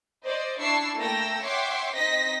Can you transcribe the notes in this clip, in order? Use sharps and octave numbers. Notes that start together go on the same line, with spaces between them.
C5 D5 D#5
D4 E4 C#6 E6 C7
A3 A#3 G5 E6 A#6
C#5 E5 F#5 G5 C6 D6
C4 D#4 D#5 A#6 B6